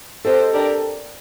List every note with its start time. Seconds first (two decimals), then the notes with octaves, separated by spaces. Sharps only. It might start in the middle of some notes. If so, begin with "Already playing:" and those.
0.25 C4 G4 A4 C5 D#5
0.53 D4 G4 A#4 D5